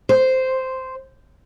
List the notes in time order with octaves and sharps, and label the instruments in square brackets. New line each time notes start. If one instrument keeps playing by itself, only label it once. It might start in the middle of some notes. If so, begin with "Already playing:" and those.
[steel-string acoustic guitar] C5